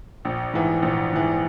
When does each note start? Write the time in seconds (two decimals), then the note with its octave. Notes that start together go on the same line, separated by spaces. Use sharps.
0.25 A#1
0.54 G#2 E3
0.82 A#1
1.13 G#2 E3